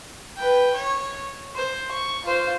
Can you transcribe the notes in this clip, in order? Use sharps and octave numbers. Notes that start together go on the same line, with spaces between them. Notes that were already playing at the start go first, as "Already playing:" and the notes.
B4 G5
C#5
C5
C#6
F4 C5